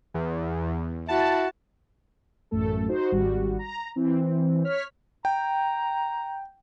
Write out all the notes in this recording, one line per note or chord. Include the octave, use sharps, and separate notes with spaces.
E2
E4 F#4 A5
A1 F#2 A3 A4
D#4 F#4 C5
G#1 G3 F#4
A#5
E3 C4
C#5 F6 B6
G5 A#5